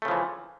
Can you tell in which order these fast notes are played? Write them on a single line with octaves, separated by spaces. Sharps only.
A3 C#3 F3 E3